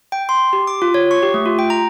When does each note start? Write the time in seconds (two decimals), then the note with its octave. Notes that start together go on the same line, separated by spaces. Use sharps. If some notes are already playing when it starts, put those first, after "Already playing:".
0.12 G5
0.29 C6
0.53 G4
0.67 D6
0.82 F4
0.94 C#5
1.11 C#6
1.22 G4
1.34 A3
1.46 F4
1.59 G5
1.70 A#5